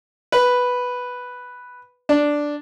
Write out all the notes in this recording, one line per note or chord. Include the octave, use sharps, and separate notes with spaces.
B4
D4